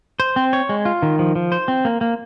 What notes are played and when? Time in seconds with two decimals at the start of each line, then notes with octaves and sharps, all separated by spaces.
0.20 C5
0.36 C4
0.53 C#5
0.69 G#3
0.85 F4
1.02 D#3
1.19 F3
1.35 F3
1.52 C5
1.68 C4
1.85 A#3
2.01 A#3